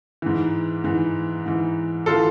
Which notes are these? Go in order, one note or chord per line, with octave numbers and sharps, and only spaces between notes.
G#2 E3
G#2 E3
G#2 E3
E3 F4 A4